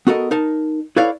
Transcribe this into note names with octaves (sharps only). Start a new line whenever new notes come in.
B3 F#4 A4 A#4 D#5
D#4 A#4 A5
E4 A4 B4 C#5 D5 F5